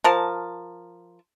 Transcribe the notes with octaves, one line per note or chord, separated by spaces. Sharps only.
F3 A#4 A5